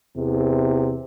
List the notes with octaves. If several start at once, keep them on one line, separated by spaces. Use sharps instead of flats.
E2 C3